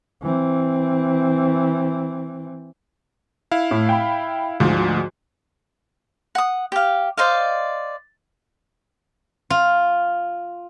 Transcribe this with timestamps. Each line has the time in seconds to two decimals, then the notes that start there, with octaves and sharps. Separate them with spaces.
0.22 E3 C4
3.52 E4 F5
3.71 A2
3.89 G5 B5
4.60 D2 G#2 F3
6.35 F#5 D#6
6.72 G4 F5
7.17 C5 D5 D#5 F5
9.50 F4